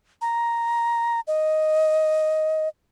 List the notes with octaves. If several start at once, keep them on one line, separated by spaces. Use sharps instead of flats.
A#5
D#5